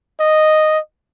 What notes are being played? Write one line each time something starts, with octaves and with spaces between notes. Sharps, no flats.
D#5